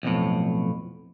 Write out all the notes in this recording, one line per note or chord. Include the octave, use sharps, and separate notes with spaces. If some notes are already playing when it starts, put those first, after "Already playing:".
B1 F2 A2